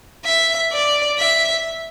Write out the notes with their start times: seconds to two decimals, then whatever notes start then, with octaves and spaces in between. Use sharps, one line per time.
0.25 E5
0.72 D5
1.18 E5